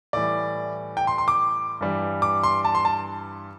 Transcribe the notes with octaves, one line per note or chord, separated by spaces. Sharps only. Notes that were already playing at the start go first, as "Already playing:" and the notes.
A2 E3 G3 D5
G5
C6
C6
D6
G2 E3 G3
D6
C6
A5
C6
A5